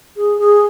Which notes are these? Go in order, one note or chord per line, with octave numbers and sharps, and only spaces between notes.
G#4
G#4